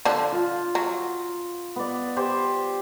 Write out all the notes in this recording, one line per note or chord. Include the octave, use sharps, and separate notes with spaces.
D3 F3 D4
F4
F#3
B3 D5
G4 C5 G#5